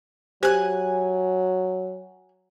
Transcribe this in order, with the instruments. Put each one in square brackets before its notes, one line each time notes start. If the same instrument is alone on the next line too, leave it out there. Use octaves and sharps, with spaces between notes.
[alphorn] F#3 [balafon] G4 C5 [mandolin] G#5 F#6